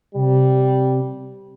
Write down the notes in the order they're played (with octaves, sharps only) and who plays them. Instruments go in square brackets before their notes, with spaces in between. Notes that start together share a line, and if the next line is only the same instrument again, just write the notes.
[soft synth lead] C3 [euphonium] G3